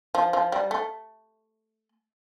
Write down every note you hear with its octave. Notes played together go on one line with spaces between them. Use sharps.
F3
F3
G3
A3